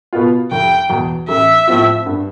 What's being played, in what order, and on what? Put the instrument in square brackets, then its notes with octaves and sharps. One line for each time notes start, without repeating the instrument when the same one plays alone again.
[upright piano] B2 B3 F4
[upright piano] F1 [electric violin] G5
[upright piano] E2 B2
[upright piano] A1 [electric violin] E5
[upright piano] A2 F3 C4 F4
G2